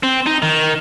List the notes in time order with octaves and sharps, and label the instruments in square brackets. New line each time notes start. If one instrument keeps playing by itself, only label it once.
[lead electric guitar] C4
D#4
D#3